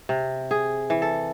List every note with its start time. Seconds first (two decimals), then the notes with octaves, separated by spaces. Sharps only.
0.09 C3
0.51 G#4
0.90 E3
1.02 A4